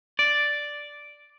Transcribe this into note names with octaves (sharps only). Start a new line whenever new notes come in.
D5